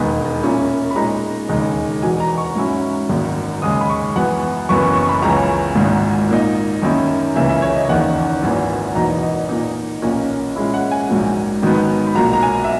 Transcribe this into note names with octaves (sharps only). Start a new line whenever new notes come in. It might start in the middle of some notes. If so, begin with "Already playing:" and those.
Already playing: E1 D#2 D#3 G#3 B3 G#5
A#2 A#3 C#4 E4
B5
A#2 G#3 D#4 A#5
E1 D#2 C#3 G#3 D#4
E2 B2 F#3 G#5
A#5
C#6
G#2 F#3 C#4 E4
G#1 F#2 D#3 A#3
D#2 C#3 G#3 D#6
B5
C#6
F#2 E3 B3 F#5
F#1 F#2 E3 B3 C#6
C#6
C#6
B5
C#2 C#3 E3 A#5
G#1 G#2 D#3 A#3
A#2 A#3 D#4
F#2 D#3 A#3 C#4 E4
C#2 C#3 E3 A#3 E5
E5
C#5
D#5
F#1 E2 D#3 A#3 F#5
G#1 F#2 E3 A#3
E2 B2 A#3 D#4 A#5
D#5
A#2 A#3 D#4
B1 A#2 A#3 C#4
A#2 G#3 C#4 E4
F#5
G#5
A#1 G#2 F#3 A#3
G#2 D#3 F#3 B3
B5
B1 A#2 F#3 A#3 A#5
A#5
G#5
E5